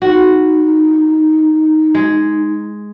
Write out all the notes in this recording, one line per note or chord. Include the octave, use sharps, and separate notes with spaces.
D#4 F#4
G#3